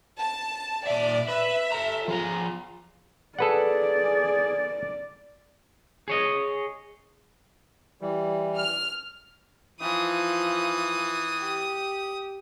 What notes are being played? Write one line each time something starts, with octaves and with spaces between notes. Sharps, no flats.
A5
A#2 D5 E5
B4 E5
A4 A#5
F3 F4 G#4 A#5
G#4 A4 B4 D5 F#5
G#4 C#5 D#5
E3 G3
F6
E3 F3 D#6
G4